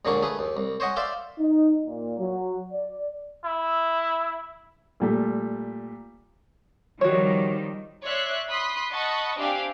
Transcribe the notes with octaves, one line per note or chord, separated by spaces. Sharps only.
D#2 A#2 D3 G#3 A#3 C#6
A3 G#4 B4
D#2
C2
C5 C#5 D#5 F#5 G#5
C5 D5 E5 F5 C6
D#4
A#2
F#3
D5
E4
A#2 G3 A3
D#3 F3 G3 F#4 C#5
C#5 D5 E5 C6 F#6
B5 C6 D#6 F#6 B6
D#5 F#5 A5 B5 C#6 D#6
C4 D4 G4 E5 F5 G#5